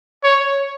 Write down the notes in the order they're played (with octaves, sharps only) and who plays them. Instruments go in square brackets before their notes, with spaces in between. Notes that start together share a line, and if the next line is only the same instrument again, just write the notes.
[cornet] C#5